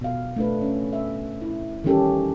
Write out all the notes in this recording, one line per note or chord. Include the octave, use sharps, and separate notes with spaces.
B2 F5
A3 D4 B4
C#4
E5
E4
D#3 E3 G3 C#4 G4 A4